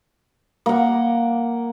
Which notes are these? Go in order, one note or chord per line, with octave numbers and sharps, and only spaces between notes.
A#3 F#5